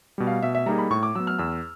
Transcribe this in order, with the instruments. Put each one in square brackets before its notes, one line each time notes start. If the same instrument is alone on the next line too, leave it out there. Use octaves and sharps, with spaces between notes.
[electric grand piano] B2 G3
[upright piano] F5
[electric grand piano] B2 [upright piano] E5
[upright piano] E5
[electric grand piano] G3 A#3 D#4 G#4 [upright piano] A#5
[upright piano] B5
[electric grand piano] A2 [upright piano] C#6
[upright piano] D6
[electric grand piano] F#3 B3 [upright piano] E6
[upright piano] F6
[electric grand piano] E2 [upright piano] E6